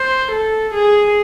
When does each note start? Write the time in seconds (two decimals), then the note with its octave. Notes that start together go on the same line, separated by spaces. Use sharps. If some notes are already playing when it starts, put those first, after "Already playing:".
Already playing: C5
0.31 A4
0.74 G#4